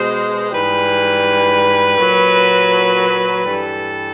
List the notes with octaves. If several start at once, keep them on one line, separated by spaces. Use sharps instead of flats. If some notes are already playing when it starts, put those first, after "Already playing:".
Already playing: B2 G#3 C5
G#2 E3 G3 B4
A#2 F#3
G2 E3 G3 A4